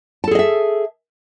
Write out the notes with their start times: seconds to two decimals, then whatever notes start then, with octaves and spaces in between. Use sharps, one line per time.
0.24 A5
0.28 A4
0.31 G#4
0.35 D#5
0.39 E5